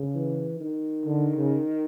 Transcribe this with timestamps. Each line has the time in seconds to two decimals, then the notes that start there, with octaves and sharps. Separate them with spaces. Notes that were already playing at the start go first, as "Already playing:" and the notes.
Already playing: C#3
0.15 E3
0.61 D#3
1.05 D3
1.36 C#3